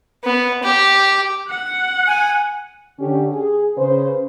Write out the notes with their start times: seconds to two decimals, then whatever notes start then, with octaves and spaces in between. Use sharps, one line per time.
0.24 B3
0.63 G4
1.49 F#5 F#6
2.07 G#5
2.99 D3 C#4 G4
3.32 G#4
3.76 C#3 C#4 B4 C5